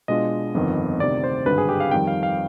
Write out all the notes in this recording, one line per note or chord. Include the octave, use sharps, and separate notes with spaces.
B2 G#3 D4 F4 D#5
G1 F2 D#3 B3
D2 C3 D#3 D5
C5
G#1 G2 D3 B4
G#4
G4
F5
F2 D#3 G3 G5
F5
F5